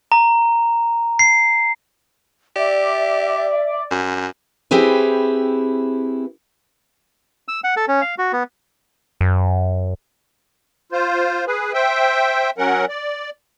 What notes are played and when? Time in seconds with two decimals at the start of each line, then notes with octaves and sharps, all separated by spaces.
0.12 A#5
1.19 C7
2.56 G4 D5 E5
3.91 F#2
4.71 C4 E4 G4 G#4 B4
7.48 E6
7.64 F#5
7.77 A4
7.88 C#4
8.02 F5
8.18 F#4
8.33 B3
9.21 F#2
10.92 F4 C5
11.47 G#4 B4
11.73 C5 E5 G5
12.58 F#3 C#4 A#4 F#5
12.89 D5